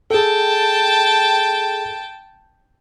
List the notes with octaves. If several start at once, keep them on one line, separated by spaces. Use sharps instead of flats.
G#4 A4 G5 A5